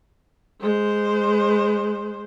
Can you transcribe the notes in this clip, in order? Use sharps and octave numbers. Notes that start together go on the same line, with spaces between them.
G#3 C5